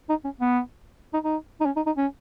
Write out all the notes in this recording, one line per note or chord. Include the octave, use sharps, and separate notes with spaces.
D#4
C#4
B3
D#4
D#4
D#4
C#4
D#4
D#4
C#4